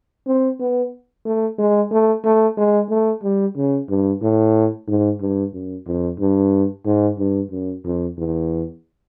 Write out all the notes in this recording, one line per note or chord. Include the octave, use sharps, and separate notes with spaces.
C4
B3
A3
G#3
A3
A3
G#3
A3
G3
C#3
G2
A2
G#2
G2
F#2
F2
G2
G#2
G2
F#2
F2
E2